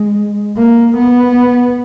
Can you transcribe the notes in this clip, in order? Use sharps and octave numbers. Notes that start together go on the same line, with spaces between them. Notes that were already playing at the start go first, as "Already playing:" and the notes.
Already playing: G#3
A#3
B3